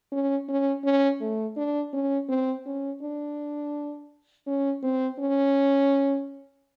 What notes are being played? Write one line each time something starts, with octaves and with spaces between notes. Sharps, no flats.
C#4
C#4
C#4
A3
D4
C#4
C4
C#4
D4
C#4
C4
C#4